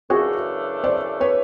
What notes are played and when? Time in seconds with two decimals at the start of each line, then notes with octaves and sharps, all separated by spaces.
0.10 F#2 C#3 E3 A3 D4 F#4 G#4
0.84 C5 D5
1.20 B4 C#5